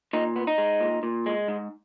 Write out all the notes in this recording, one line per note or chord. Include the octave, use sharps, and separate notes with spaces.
A#2 D#4
B3
D#4
G#3
A#2
A#2
G#3
G#2